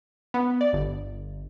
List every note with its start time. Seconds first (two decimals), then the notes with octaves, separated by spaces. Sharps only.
0.34 B3
0.61 D5
0.73 G1